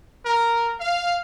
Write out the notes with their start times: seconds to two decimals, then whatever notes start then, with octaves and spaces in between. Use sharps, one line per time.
0.24 A#4
0.79 F5